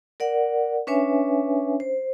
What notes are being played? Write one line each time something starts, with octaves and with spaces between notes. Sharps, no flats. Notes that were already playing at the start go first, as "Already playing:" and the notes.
A#4 D5 F#5
C#4 D4 B4 C#5 E5 G#5
C5